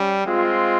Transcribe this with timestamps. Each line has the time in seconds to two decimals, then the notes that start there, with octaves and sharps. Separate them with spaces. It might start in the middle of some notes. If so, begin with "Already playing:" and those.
Already playing: G3 C#4
0.25 G#3 C4 F4